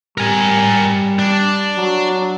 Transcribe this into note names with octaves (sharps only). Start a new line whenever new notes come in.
G3 A#4 G#5
D4
F#3